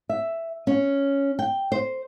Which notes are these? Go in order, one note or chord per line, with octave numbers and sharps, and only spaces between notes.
E5
C#4
G5
C5